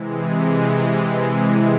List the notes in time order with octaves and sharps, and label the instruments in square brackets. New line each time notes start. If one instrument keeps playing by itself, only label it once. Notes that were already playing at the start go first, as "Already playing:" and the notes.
Already playing: [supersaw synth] C3 E3 G#3